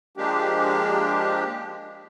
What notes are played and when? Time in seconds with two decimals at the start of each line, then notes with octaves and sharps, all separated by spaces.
0.17 F3 G#3 A#3 D4 G4